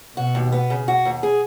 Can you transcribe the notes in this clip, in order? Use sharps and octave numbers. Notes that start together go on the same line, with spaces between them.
B2 F#4
D#2
B3
C#3
F#4
D#2
G#4